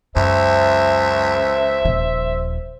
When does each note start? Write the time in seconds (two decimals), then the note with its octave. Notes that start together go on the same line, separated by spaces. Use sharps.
0.16 C#2 F#2 C5 E5
1.85 D#1 F3